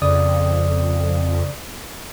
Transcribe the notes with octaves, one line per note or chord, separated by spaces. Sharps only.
F2 C#3 D5 D#6